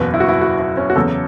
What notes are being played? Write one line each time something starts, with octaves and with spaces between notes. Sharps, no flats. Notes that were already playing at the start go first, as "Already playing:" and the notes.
Already playing: F#1 E2 B2 B4
E4
F#4
E4
F#4
E4
C#4
F#4
E2 C#3 F#3 A4